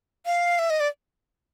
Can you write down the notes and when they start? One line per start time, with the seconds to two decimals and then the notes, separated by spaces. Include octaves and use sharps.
0.26 F5
0.59 E5
0.70 D#5
0.80 D5